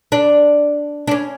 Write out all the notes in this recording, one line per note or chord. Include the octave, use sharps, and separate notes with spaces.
D4
D4
C#4